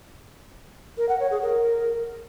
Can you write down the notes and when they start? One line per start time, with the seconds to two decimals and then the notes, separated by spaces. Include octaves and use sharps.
0.98 A#4
1.09 F#5
1.20 C#5
1.31 G#4
1.42 A#4